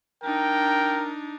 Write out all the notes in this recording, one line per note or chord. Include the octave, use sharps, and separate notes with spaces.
D4 D#4 A#4 G5